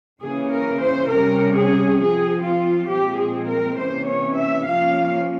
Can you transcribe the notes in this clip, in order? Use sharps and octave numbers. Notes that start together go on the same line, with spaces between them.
C#3 E3 A#3 C#4 G#4
A#4
C5
C3 G3 C#4 A#4
G#4
F3 C4 G#4
F4
A#2 F3 G#3 C4 G4
G#4
A#4
C3 E3 A#3 C#4 C5
C#5
E5
F3 A#3 C#4 F5